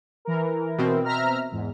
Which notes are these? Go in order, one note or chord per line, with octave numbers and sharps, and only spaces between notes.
E3 A#4
B2 C4
E5 A#5 F6
E2 G#2